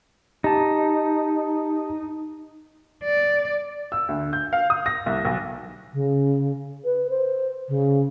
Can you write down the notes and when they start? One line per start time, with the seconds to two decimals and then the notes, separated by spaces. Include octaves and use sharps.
0.44 D#4 G4 A5
3.04 D5
3.92 E6
4.08 D2
4.33 G6
4.53 F5
4.70 D#6
4.86 A#6
5.06 C2
5.25 B1
5.93 C#3
6.85 B4
7.10 C5
7.68 C#3